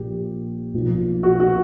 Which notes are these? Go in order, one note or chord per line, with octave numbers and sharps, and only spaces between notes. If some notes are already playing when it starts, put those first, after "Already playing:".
Already playing: A#1 A#2 F3 G4
B1 A#2 F3
F#4
F#4